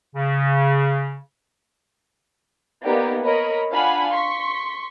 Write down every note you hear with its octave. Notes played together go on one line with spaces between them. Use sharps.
C#3
A#3 B3 D#4 G4 D5
A#4 C#5 D#5 B5
D4 F4 F5 F#5 G#5 B5
C6 C#6 B6